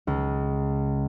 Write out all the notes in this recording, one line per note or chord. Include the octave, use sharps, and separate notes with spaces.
C#2